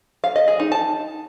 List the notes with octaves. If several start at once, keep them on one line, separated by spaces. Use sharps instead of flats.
F5
D#5
G#4
D#4
A5